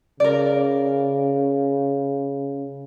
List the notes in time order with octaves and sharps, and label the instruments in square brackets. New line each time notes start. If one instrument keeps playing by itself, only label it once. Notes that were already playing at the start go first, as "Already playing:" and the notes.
[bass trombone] C#3 [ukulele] A#4 D5